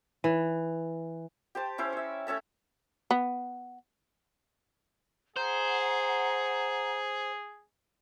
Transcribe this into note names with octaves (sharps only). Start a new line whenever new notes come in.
E3
G4 C5 A5
C#4 E4 C5
C#5 E5
A3 C#4 E5 A5
B3
G#4 C5 F#5 A#5